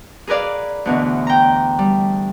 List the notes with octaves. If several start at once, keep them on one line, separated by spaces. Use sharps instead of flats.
G#4 A#4 B4 D5 F5
D2 B2 E3
G5 A#5
G3